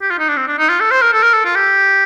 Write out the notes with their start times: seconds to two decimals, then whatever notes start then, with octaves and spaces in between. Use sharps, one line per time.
0.02 G4
0.11 F4
0.19 D#4
0.29 D4
0.37 C4
0.48 D4
0.59 D#4
0.69 F4
0.80 A4
0.91 C5
1.02 A#4
1.13 A4
1.23 A#4
1.34 A4
1.45 F4
1.56 G4